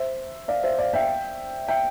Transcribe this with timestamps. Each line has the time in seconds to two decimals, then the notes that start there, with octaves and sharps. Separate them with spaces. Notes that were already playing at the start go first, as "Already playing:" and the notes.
Already playing: C5 E5
0.48 D5 F5
0.63 C5 E5
0.79 D5 F5
0.94 E5 G5
1.68 E5 G5